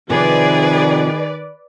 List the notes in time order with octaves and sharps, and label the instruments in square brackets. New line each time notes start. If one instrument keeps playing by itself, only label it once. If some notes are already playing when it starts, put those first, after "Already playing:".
[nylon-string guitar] C3 F3 [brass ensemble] D#3 [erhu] G#4 [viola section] B4 D5